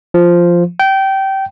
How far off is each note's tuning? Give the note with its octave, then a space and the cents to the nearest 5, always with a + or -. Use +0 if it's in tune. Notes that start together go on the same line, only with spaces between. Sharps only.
F3 -5
G5 -20